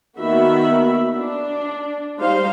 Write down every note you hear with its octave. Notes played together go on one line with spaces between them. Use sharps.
D#3 A#3 B3 F#4 E5 B5
D4
G3 D#4 C5 F5